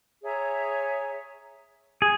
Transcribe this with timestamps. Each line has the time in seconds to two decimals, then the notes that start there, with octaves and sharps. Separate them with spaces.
0.22 G#4 C#5 E5 A#5
2.02 G#4